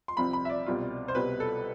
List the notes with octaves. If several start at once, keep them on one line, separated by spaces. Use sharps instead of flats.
C6
C2 C3 F3 C4 F4 B5
B5
E5
D5
C2 B2 G3 C4 F4
C5
C2 B2 G3 C4 B4
A4